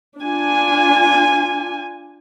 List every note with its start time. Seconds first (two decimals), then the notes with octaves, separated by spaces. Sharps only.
0.22 D4 F4 G#5